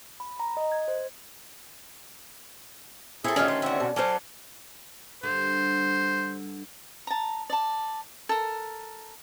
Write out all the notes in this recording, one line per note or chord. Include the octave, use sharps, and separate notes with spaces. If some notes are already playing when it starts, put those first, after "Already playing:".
B5
A#5
D#5
G#6
C5
C4 E4 G#4 A4 C#5 E5
D2 D#3 C#4 F4 C5 D5
A3 C6
D3 C4 F#4 E5
B2
F#3 C#4 D4 A4 C5 G#5 D6
G2 D3 C5
A5 A#5
D5 A5
A4 A#4